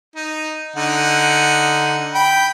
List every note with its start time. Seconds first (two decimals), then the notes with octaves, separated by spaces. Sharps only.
0.16 D#4
0.76 D3 D#4 F#5
2.14 G5 B5